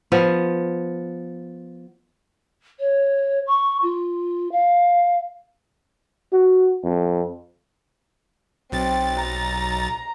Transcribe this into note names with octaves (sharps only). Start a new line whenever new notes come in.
F3 B3
C#5
C#6
F4
F5
F#4
F2
B1 C4 A6
A#5